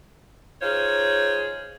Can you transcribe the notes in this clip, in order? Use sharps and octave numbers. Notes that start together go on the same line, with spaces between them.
D#4 F4 G#4 C5 C#5